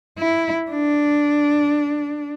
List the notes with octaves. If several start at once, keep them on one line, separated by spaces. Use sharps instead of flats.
E4
D4